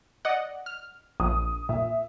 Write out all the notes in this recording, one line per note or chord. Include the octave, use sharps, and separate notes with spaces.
D5 D#5 F#5
F6
A#1 D#6
A#2 E5